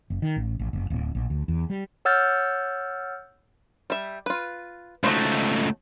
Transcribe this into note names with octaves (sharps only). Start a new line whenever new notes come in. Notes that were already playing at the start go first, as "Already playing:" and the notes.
F#1
D#3
A1
A1
F#1
D1
A#1
D2
E2
G3
C#5 F#5 E6 F6 G6 A6
G3 E5
F4 B4
C#2 A3 D#4 F#4 C5